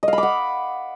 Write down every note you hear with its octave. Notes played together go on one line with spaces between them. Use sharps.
D#5
F5
B5
D6
F#5